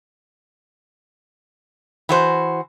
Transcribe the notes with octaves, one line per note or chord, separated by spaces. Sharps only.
E3 F#4 C5